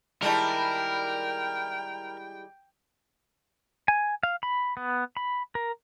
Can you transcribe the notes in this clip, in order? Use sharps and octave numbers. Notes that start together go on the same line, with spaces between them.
D#3 G3 G#3 E4 A#4 C#5 G5 A5
G#5
F5
B5
B3
B5
A#4